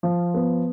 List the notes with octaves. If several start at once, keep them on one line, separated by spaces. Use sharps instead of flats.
F3
B3